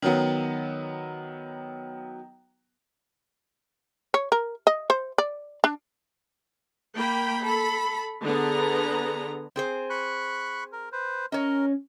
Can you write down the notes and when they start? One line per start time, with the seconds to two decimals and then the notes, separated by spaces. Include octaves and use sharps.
0.02 D#3 F#3 B3
4.14 C#5
4.32 A#4
4.67 D#5
4.90 C5
5.18 D5
5.64 D4
6.95 A#3 G5 B5
7.44 A4 B5
8.24 D3 B3 G#4 A#5
9.56 C4 G#4 C5
9.90 B5 C#6 F#6
10.72 A#4
10.92 B4 C5
11.32 C#4 A#4 C#5 D#5